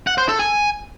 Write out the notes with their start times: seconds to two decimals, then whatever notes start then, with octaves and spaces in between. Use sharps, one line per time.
0.07 F#5
0.18 C5
0.29 A4
0.39 G#5